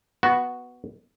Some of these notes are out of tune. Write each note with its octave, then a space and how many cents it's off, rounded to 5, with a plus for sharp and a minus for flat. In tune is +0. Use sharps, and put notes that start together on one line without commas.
B3 +0 F#4 +0